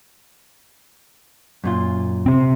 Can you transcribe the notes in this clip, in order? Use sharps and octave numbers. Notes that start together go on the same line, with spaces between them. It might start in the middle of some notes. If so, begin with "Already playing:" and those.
F#2 A#2 F4
C3 C4